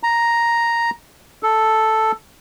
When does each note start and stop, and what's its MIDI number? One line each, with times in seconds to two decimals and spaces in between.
0.03 0.90 82
1.43 2.12 69